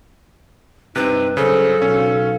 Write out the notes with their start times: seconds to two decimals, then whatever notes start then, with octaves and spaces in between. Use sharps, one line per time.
0.96 G2 C3 C4 D#4 B4
1.37 G2 C#3 F#3 A4 C5
1.82 B1 C#4 F5